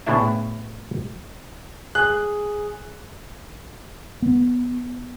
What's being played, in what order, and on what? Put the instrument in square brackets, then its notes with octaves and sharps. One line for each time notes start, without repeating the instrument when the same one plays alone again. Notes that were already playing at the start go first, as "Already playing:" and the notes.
[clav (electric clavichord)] A2 C#3 B3 D4 E4 E5
[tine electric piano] G#4 [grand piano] F#6
[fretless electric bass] B3